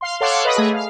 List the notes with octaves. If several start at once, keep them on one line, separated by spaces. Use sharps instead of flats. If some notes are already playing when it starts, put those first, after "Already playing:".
F5 C6
A4 C#5 F5 F#5 C6 D6
B4 D#5 B5 D#6
A3 G#4
F5